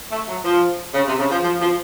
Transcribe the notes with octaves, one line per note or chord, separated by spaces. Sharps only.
A3
F#3
F3
C#3
C3
C#3
F3
F3
F3